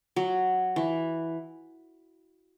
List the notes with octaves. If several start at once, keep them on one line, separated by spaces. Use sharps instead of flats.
F#3
E3